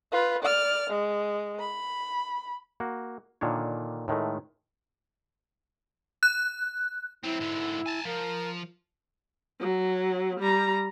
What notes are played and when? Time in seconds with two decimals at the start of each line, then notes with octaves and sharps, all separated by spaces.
0.12 F4 B4
0.42 D5 F6
0.90 G#3
1.60 B5
2.80 A#3 F#4
3.41 A#2 D3 D#3 D4 C#5
4.08 A2 D#3 G#3 A3
6.23 F#6
7.23 F#3 C4 E4
7.40 G#2 D3
7.86 G#5 A5
8.05 F3 A#4
9.60 F#3
10.40 G3 A#5